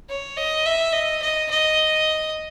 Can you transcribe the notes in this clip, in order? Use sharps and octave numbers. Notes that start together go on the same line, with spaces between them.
C#5
D#5
E5
D#5
D#5
D#5